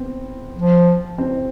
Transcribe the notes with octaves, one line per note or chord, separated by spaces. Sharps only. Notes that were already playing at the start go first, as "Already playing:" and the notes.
Already playing: B3 C4
F3
C4